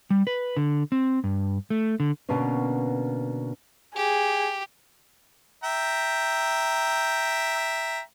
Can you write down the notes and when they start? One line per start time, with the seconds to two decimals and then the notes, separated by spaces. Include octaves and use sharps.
0.10 G3
0.27 B4
0.57 D3
0.92 C4
1.24 G2
1.70 A3
2.00 D3
2.29 B2 D3 A#3 B3 C#4
3.96 G4 G#4
5.64 E5 G5 A#5